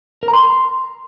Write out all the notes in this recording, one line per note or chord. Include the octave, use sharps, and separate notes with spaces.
A#4
A#5
C6